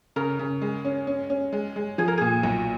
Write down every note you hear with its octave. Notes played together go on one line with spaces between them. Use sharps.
C#3 A#4
C#3
G#3
C#4
C#4
C#4
G#3
G#3
F3 G#4
A#4
A#2 G#4
B1 F#4